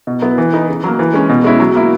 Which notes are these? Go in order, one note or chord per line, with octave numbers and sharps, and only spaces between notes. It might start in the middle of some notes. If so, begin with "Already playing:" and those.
B2
F#3 B3 E4
E3
B3 D#4
C#3
F#3 A#3
E3
G#3 C#4
B2
G#3 C#4 E4
F#3
A#3 E4